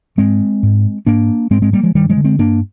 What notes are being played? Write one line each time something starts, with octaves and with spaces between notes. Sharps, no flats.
G#2 G#3 C4
G#2
G#2 A#3 D4
G#2 G#3 C4
G#3 C4
G3 A#3
F3 G#3
G2 D#3 G3
F3 G#3
D3
G#3 C4
G2 A#3 D4